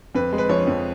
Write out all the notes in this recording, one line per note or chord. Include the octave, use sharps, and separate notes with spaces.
F2 B4
G#3
B4
F3 C#5
F2